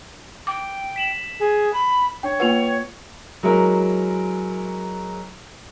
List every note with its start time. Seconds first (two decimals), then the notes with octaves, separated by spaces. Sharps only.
0.47 G5 D6
0.96 B6 E7 F#7
1.39 G#4
1.73 B5
2.23 D4 C#5 G5
2.40 A#3 F4 B4 F#5 G5 F7
3.43 F#3 G#3 E4 A#4